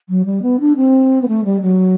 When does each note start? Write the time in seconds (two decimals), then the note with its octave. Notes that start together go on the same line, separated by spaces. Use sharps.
0.09 F#3
0.25 G3
0.42 B3
0.60 D4
0.76 C4
1.22 B3
1.28 A3
1.44 G3
1.61 F#3